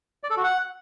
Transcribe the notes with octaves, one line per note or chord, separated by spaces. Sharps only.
D5
A4
F#4
F#5